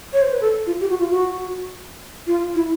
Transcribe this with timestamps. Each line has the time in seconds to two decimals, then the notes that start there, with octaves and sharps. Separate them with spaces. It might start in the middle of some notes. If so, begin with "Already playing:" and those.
0.13 C#5
0.22 C5
0.32 B4
0.41 A4
0.67 F4
0.80 G4
0.90 F#4
1.00 F4
1.10 F#4
2.27 F4
2.55 E4